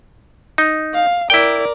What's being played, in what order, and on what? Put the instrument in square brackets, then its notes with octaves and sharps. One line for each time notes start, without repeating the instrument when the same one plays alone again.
[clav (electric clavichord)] D#4
[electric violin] F5
[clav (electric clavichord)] E4 G5 [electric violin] A#4 D5